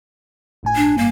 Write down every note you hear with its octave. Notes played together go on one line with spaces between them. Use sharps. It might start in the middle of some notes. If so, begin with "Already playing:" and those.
G1 A2 G#5
D4
G2 A#3